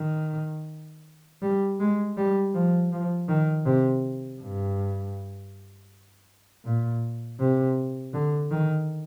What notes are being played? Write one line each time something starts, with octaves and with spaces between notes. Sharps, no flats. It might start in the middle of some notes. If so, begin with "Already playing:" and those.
Already playing: D#3
G3
G#3
G3
F3
F3
D#3
C3
G2
A#2
C3
D3
D#3